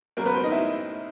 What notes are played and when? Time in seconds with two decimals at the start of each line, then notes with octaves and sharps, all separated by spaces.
0.17 G#1 F#2 C#3 F#3 A#3 A#4
0.25 B3 B4
0.34 C4 C5
0.44 D#4 D#5
0.51 E4 E5